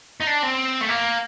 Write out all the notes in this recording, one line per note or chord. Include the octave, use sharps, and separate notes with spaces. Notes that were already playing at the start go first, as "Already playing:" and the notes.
D#4
D4
C4
A3
A#3